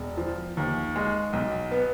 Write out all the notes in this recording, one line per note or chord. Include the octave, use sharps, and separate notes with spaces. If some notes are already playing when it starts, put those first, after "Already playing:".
Already playing: E1
F3
D#2
G#3
B1
B3